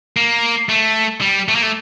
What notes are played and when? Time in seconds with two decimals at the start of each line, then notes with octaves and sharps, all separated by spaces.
0.17 A#3
0.69 A3
1.21 G3
1.48 A3
1.55 A#3
1.62 A3